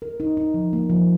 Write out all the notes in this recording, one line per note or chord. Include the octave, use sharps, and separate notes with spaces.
A#4
D#4
D#4
F3
A#3
F3